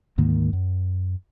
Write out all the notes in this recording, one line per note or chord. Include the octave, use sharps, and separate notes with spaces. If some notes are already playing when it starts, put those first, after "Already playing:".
D2 G#2 D#3 A#3
F#2